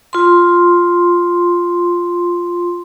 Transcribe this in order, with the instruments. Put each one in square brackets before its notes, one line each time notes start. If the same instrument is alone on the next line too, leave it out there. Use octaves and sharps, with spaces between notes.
[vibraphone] F4 C6